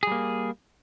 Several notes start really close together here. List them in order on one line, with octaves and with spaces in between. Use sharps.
G#4 G3 A#3